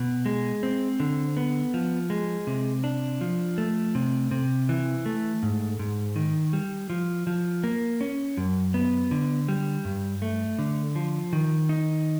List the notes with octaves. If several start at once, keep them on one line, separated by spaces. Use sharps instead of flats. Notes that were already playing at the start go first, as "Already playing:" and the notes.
Already playing: B2
G#3
C4
D3
B3
F3
G#3
C3
D4
F3
A3
C3
C3
E3
A3
G#2
G#2
D#3
G3
F3
F3
A#3
C#4
F#2
B3
D3
G3
G2
A3
D3
F3
D#3
D#4